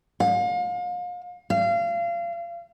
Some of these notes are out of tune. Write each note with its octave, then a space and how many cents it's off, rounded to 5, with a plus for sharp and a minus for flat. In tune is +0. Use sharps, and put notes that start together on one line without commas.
F5 +35
F5 -30